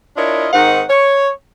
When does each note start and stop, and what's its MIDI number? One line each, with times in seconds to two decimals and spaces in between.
0.16 0.47 62
0.16 0.47 64
0.16 0.47 65
0.16 0.47 70
0.16 0.47 73
0.16 0.47 75
0.53 0.82 44
0.53 0.82 51
0.53 0.82 60
0.53 0.82 63
0.53 0.82 78
0.88 1.29 73